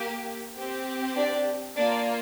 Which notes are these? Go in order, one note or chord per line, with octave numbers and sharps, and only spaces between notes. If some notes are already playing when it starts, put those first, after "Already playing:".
Already playing: A#3 G4
C4 G4
D4 D5
A#3 D4 F4 D5